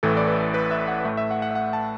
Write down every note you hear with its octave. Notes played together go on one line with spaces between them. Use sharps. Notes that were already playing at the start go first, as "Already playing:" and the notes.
A1 A2 E3 A3 A4
D5
B4
B4
E5
F#5
A2 A3
E5
F#5
F#5
E5
F#5
A5